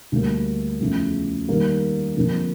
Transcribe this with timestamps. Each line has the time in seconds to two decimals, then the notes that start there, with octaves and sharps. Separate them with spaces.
0.12 D2 D3 G3 A#3
0.80 E2 C#3 F3 A3
1.49 D#3 G3 A#3
2.17 F2 D3 F3 A#3